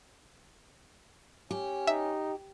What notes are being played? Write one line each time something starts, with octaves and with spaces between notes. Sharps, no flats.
C#4 G4
D#4 E5